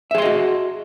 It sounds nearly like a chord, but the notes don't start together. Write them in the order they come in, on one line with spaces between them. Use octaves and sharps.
E5 G#4 C6 D#5 F#4